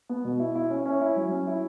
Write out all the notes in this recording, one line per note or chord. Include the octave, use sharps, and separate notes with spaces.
B3
B2
E4
E4
C#4
C#4
E4
F#3
C#4
E4